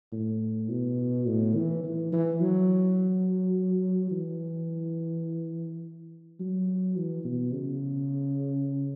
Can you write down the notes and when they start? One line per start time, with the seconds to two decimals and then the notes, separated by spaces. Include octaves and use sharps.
0.13 A2
0.69 B2
1.27 A2
1.56 E3
1.84 E3
2.12 E3
2.40 F#3
4.11 E3
6.40 F#3
6.97 E3
7.25 B2
7.53 C#3